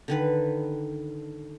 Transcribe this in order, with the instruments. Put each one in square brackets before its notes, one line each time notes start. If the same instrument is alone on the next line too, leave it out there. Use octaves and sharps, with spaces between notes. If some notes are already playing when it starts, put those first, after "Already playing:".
[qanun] D3 D#3 B4